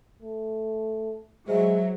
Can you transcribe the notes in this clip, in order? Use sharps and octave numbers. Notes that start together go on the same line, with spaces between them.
A3
F#3 G#3 G#4 C5 E5